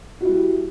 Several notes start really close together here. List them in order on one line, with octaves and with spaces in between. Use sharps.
F#4 E4 G3